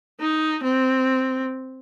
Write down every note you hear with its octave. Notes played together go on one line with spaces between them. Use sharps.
D#4
C4